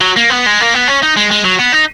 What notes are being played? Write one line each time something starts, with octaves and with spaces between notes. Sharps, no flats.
F#3
A#3
B3
G#3
A#3
B3
C#4
D#4
G#3
G#3
F#3
B3
D#4